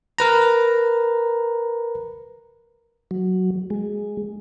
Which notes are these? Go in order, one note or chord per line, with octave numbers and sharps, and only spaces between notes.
A#4 B4 A#5
F#3
G#3